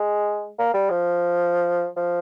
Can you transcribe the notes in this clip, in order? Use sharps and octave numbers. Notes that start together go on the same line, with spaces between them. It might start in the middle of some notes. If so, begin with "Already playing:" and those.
Already playing: G#3
A#3
G3
F3
F3